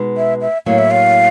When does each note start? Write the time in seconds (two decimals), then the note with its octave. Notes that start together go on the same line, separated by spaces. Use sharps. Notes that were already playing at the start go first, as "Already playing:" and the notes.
Already playing: B2 G#3 B3 D#4
0.17 E5
0.41 E5
0.66 A2 F#3 A#3 F5
0.78 E5
0.91 F5